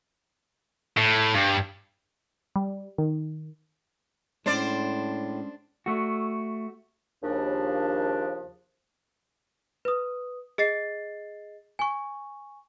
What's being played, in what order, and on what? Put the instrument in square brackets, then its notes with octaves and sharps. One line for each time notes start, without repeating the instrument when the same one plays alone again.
[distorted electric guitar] A2
G2
[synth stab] G3
D#3
[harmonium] A2 [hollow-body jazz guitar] G#3 C#4 [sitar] D4 C5 D5
[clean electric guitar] A3 F#4
[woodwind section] D#2 C#3 F3 D4
[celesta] B4 D#6
G#4 D#5 A6 C7
G#5 C#6